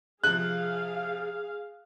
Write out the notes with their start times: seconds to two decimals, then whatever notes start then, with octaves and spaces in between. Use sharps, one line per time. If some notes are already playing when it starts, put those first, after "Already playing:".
0.24 C3 F3 G#4 F5 F#6